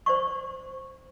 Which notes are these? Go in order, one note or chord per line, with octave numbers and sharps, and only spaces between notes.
C5 D5 C#6